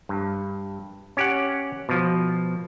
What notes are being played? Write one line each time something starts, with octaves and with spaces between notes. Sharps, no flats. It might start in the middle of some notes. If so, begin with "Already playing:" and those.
G2
C#4 G4 F#5
B2 F3